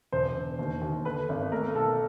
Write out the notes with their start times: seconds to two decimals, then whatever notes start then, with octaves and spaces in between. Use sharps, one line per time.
0.12 E1 C5
0.36 E1
0.59 D#2
0.81 D#2
1.05 D3 B4
1.29 G#1
1.52 A3 A#4
1.75 B1 A4